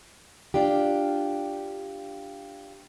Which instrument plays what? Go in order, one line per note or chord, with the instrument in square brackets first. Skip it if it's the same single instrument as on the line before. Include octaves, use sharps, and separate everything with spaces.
[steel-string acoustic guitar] D4 F4 G4